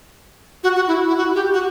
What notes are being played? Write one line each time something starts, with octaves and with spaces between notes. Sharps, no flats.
F#4
F#4
E4
E4
F#4
G4
F#4